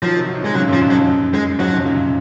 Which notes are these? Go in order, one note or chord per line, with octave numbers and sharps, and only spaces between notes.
D#3 F3 F#3
C3 D#3
D#3 F#3
C3 D#3 G#3
A#2 C#3 F#3
F#2 A#2
F3
F2 G#2
F#3
F2
F#2
G#3
F2 G#2 F#3
G#2 C3
A#2 C#3